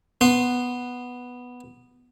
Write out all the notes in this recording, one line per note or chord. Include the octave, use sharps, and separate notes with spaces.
B3 C6